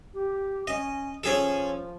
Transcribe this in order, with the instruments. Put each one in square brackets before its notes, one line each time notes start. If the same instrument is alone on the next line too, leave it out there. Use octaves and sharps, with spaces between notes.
[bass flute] G4
[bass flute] C#4 [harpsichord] D#5
[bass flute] F3 [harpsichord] C#4 G#4 A4